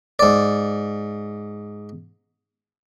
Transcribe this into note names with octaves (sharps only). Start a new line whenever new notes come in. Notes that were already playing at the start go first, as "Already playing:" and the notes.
G#2 D5